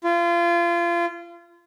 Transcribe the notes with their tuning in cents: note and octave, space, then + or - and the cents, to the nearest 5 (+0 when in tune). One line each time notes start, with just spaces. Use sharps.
F4 -30